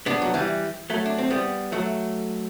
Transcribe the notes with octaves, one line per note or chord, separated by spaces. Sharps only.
B3 D4
F#3
E3 G3
F#3 A3
D4
C4
G3 B3
F#3 A3